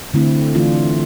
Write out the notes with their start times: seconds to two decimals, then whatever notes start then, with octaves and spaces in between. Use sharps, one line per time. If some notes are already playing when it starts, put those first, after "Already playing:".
0.14 D3 A3 C4 E4
0.55 E3 A3 D4 F4